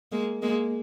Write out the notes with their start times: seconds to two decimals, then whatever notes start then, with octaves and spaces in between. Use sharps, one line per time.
0.12 G#3 A#3
0.42 G#3 A#3